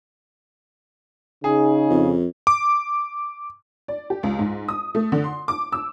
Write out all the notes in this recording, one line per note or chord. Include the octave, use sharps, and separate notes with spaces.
C#3 D#4 G#4
F2
D6
D5
G4
C#2
G#2
D#6
A3
D3
C6
D6
E6